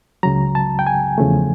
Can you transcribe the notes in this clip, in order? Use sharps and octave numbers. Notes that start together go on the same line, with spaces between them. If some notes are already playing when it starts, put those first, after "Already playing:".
C#2 C#3 F#3 A#5
A5
G5
G#5
E2 C#3 F3 A3